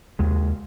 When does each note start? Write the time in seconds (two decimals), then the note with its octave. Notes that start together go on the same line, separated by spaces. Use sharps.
0.19 D#2 C#3 G#3